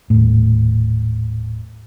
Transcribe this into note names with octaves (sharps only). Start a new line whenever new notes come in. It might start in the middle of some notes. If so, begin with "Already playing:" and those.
D#1 A2